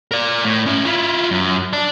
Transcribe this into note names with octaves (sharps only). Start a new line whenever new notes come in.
A#4 D5
A2
C#4 E5
E4 F4
F#2
D5 A5